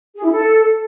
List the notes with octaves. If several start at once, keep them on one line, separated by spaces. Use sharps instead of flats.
G#4
E4
A4